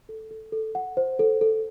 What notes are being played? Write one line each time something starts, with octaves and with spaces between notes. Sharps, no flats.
A4
A4
A4
F#5
C5
A4
A4